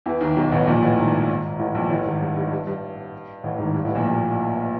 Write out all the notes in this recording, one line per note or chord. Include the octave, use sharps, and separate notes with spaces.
E2 E3
D#2 D#3
B1 B2
A1 A2
A#1 A#2
A1 A2
G#1 G#2
A1 A2
A#1 A#2
A1 A2
G#1 G#2
G2
G2
G2
G2
A1 A2
G#1 G#2
G2
A1 A2
A#1 A#2
A#1 A#2